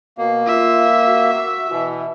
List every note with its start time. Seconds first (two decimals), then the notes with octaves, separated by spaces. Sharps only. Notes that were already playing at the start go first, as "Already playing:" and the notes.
0.18 B2 A#3
0.47 F4 E5
1.08 F#4
1.71 B2 E3